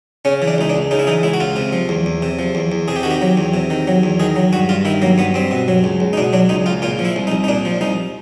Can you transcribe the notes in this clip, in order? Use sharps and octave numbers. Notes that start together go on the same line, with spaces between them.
C#3 C#4
E3
D4
C#2 D#4
D4
C#2
C#3 D#4
E4
E3 D#4
C#2 E4
F#4
C#2 F4
C3
F3
E2
E2
C3
F3
E2
E2
C3 G#4
G4
D#3 F#4
G4
F#3
E2
C3
D#3
F#3
E2
D#3 G#4
F#3
G2 F#4
G2 F4
D#3 E4
F#3 A#3
G2 B3
G2 C4
B2
F#3
C#2
C#2
D#4
B2 D4
F#3 D4
C#2 D#4
C#2 F4
A#2 F4
F3
E4
C2
D#4
C2
D#4
A#2 D4
F3
C2 D#4